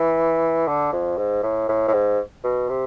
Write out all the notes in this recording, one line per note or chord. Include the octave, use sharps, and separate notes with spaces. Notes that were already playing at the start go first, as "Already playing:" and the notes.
Already playing: E3
D3
F2
G#2
A2
A2
A2
G#2
B2
C3